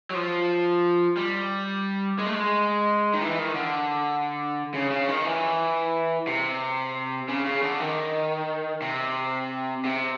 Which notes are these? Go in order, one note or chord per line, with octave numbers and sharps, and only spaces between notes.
F#3
F3
G3
G#3
A3
G#3
D#3
E3
D#3
D3
C#3
C#3
D#3
E3
C3
C#3
C#3
D3
D#3
C3
C3